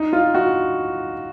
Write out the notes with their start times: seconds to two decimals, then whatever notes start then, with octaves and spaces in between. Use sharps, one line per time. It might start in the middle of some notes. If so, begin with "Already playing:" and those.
Already playing: D#4
0.13 F4
0.35 F#4